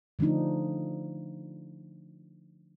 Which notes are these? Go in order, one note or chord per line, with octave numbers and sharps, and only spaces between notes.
D3 F3 A3 D4 D#4